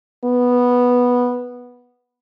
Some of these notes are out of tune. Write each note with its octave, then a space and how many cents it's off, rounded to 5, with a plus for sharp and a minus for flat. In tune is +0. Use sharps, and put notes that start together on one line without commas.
B3 -5